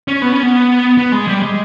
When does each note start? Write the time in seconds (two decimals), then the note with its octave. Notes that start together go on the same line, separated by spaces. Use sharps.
0.08 C#4
0.22 B3
0.32 C#4
0.43 B3
0.98 B3
1.12 G#3
1.27 G3
1.42 G#3